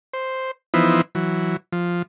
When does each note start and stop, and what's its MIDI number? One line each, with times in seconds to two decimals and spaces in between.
0.13 0.51 72
0.74 1.01 52
0.74 1.01 53
0.74 1.01 59
0.74 1.01 63
0.74 1.01 64
0.74 1.01 72
1.15 1.56 52
1.15 1.56 54
1.72 2.02 53